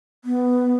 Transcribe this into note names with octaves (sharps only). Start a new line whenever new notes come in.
B3